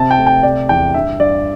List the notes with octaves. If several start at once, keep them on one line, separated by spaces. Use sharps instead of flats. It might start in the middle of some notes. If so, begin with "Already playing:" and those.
Already playing: C3 C4 A5
G5
A3
G5
C3 D5
E2 G5
G2 E5
G2 D5